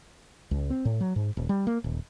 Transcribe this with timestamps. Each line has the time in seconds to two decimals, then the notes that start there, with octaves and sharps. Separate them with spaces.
0.51 C#2
0.70 C4
0.85 A2
1.01 F#3
1.16 G#2
1.37 D#1
1.49 G3
1.67 A#3
1.84 D#1